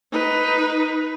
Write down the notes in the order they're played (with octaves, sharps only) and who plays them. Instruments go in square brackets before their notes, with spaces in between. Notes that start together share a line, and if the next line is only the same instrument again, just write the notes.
[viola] D#4 B4